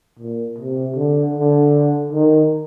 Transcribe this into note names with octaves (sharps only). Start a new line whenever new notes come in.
A#2
C3
D3
D3
D#3